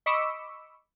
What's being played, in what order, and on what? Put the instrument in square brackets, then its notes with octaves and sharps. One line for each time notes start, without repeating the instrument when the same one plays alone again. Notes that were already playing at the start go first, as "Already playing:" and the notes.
[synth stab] D#5 B5 C#6 D6 E6